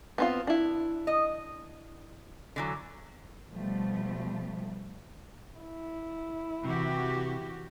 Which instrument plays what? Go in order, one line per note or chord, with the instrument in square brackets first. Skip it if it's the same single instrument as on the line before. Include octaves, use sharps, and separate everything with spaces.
[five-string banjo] B3 C4 F4
D4 E4
[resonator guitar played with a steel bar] D#5
D3 E3 F#3
[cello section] B2 F3 G3 A3
[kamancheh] E4
[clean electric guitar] C3 [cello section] E3 F#4 G4